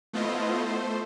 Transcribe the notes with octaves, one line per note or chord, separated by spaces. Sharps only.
A3 B3 E4 F4 C5 D#5
A3 C5